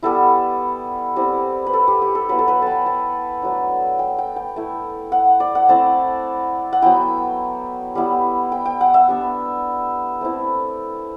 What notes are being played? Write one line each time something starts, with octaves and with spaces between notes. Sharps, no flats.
G3 B3 E4 A4
G3 C4 E4
B4
A4
G4
G4
A4
F#3 B3 E4 B4
A4
B4
G5 A5
A5
F#3 A3 D4
G5
G5
G5
A3 E4
F#5
D5
F#5
A3 C4 E4 A5
F#5
F#3 B3 E4 G5
G3 B3 E4
G5
G5
F#5
E5
G3 B3 D4
A3 C4 E4